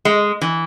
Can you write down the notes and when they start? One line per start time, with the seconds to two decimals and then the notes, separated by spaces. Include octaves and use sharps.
0.05 G#3
0.41 E3